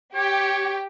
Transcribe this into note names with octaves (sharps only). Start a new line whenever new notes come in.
G4 C#5